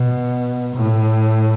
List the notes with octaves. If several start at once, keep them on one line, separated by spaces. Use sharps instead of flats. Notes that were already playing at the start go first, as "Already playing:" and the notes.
Already playing: B2
A2